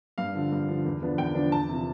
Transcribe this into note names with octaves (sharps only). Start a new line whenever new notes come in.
G2 F5
D3 F3
G2
D3 F3
E2
D3 F3 B3 D4
E2 G5
D3 F3 B3 D4
E2 A5
C3 F3